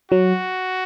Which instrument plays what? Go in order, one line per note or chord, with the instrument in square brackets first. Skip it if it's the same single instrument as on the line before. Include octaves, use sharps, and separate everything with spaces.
[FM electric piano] F#3 [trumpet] F#4